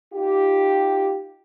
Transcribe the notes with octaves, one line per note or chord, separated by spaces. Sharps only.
D#4 F4 G4